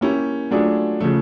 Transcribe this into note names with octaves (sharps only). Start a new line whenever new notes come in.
A#3 C#4 E4 G4
F#3 A3 D4 F4 G#4
C#3 F3 A3